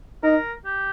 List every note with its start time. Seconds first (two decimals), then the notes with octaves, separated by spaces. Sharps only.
0.23 D#4 A#4
0.66 G4